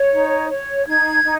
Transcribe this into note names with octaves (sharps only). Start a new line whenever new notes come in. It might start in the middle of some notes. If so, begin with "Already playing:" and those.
Already playing: C#5
D#4
C#5
D#4 G#6
D#4